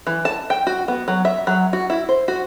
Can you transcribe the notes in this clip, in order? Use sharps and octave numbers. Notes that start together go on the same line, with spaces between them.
E3
A5
G5
F#4
B3
F#3
E5
F#3
F#4
E4
C5
F#4